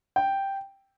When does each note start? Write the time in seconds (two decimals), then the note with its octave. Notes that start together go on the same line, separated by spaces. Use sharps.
0.16 G5